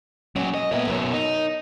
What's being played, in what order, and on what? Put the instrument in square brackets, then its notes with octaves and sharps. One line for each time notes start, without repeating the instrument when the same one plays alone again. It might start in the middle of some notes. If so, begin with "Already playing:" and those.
[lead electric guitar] A#2 F#3 [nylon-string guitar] C#4
[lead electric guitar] D#5
[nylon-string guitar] A#2 A#3 B3 [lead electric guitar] C#5 E5
[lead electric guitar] F#2 B2 [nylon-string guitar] A#4 B4 C#5
[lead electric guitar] D#4